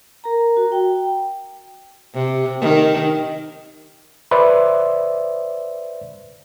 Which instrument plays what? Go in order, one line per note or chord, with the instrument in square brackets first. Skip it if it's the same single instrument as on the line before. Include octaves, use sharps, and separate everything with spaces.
[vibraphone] A#4 A#5
F#4
G5
[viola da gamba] C3
D#3
[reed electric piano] B4 C5 D5 E5